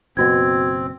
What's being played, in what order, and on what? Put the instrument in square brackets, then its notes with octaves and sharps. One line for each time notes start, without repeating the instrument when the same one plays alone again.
[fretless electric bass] F#1 B2 [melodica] C4 [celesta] F#4 G#6